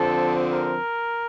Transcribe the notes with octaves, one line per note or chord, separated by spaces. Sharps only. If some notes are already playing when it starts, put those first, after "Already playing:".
Already playing: D3 F3 C4 A4
A#4